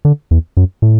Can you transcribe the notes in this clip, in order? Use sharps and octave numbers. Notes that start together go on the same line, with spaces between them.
D3
E2
F#2
A2